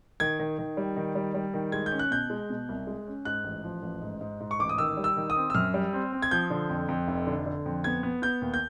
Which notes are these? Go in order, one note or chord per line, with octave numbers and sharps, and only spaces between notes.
D#3 G#6
D#3
D#3
G3
D#3
G3
G3
D#3
G#3 G#6
G6
C#4
F#6
B2 G6
G#3
B2
C2
G#3
C#4
G#2 F#6
A1
F3
A1
G#2
G#2
G#2
C#6
A1 D6
D#6
D#3 E6
G3
E6
D#3
D#6
C4
E6
F#2 F6
G3
C4
C4
G#6
F3 G6
D3
F2
F2
F1
D3
D3
F2
B3 G#6
B3
B3 G6
D#2
G6